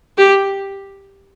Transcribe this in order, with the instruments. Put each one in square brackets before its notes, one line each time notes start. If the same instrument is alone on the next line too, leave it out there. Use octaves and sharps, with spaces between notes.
[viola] G4